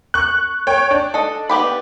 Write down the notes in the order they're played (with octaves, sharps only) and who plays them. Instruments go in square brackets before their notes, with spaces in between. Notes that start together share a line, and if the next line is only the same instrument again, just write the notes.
[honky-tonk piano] C#6 F#6
C#5 G5
D4
[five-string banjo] A4 D#5
B3 G4 B5